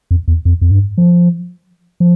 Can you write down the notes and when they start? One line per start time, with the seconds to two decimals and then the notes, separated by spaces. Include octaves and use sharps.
0.11 F2
0.28 E2
0.45 F2
0.61 F2
0.71 G2
0.98 F3
2.00 F3